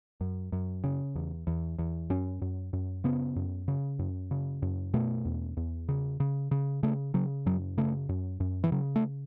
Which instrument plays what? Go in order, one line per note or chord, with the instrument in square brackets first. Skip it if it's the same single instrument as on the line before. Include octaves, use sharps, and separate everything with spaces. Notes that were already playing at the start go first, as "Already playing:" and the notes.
[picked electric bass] F#2
F#2
C#3
E2
E2
E2
F#2 C#4
F#2
F#2
C#3 B3
F#2
C#3
F#2
C#3
F#2
B2 A3
E2
E2
C#3
C#3
C#3
C#3 A3
C#3 F#3
F#2 F#3
C#3 A3
F#2
F#2
E3
C#3 F#3
A3